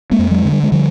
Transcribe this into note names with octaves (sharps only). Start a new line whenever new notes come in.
G#3 A#3
F2
F#3 G#3
D3
G3
G#3
D3 F3 G3